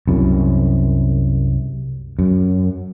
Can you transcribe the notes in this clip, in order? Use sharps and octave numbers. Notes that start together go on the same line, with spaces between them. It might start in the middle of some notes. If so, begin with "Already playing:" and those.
C2 F#2
F#2